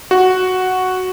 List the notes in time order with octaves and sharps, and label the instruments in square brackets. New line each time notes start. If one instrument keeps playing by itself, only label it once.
[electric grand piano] F#4